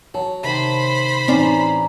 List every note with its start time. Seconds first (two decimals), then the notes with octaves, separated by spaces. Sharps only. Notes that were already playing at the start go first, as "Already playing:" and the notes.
0.14 F#3 C#5 A5
0.43 C3 D#3 C5 B5
1.28 A1 C4 C#4 D#4 D5 A#5